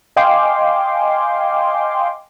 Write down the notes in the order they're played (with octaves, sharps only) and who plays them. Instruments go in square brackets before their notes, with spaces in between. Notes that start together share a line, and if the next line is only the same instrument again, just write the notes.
[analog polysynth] D#5 F5 G5 G#5 C6 D6